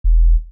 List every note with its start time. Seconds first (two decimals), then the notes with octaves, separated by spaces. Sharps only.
0.04 E1